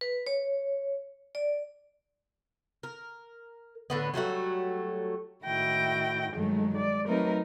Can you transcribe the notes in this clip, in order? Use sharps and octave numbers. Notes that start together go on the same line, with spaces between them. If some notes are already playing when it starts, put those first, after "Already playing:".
B4
C#5
D5
A#4
A2 D3 B3
F#3 G3 A3 F#4
A2 D#3 E4 F#4 G5 A#6
G2 D#3 F#3 G#3 A3
G#3 D5
F#3 A3 C4 D#4 A#4 B4